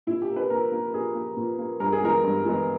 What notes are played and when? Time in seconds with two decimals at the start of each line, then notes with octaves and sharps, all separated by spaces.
0.07 A#2 E4
0.22 G4
0.29 A#3
0.36 B4
0.50 A#2 A#4
0.72 A#3
0.93 A#2 G#4
1.15 A#3
1.37 A#2
1.58 A#3
1.80 G2 A#4
1.92 G#4
2.01 E3 G#3 B3 A#4
2.23 G2
2.45 E3 G#3 B3